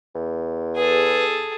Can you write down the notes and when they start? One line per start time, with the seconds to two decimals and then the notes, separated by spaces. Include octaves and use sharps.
0.15 E2
0.77 G#4 A4 B4